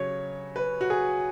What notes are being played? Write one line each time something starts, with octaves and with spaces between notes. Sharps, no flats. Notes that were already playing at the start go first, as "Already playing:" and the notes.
Already playing: C#3 F#3 C#5
B4
F#4
G#4